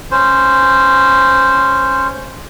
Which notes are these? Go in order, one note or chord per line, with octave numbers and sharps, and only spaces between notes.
C#4 C5